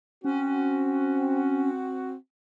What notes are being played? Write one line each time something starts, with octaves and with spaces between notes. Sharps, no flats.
C4 C#4 F#4